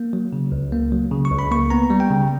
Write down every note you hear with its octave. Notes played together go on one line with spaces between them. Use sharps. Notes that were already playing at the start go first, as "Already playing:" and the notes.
Already playing: A#3
F#3
C#3
C#2
A#3
F#3
C#3
C#6
C#2
B5
A#3 C#6
B3 A#5
G3
G5
C#3